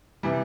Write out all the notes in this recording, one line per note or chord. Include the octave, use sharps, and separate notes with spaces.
C3 E3 G3